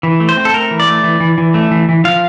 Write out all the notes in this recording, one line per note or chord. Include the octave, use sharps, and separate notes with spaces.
E3
A3
C5
C4
A4
A3 A#4
E3
D5
A3
E3
E3
E3
A3
E3
E3
F3 F5